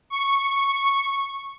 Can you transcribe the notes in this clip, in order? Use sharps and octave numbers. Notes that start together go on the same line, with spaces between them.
C#6